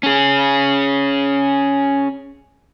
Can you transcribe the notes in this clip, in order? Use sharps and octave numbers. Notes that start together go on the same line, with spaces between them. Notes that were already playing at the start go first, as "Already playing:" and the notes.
C#4 G#4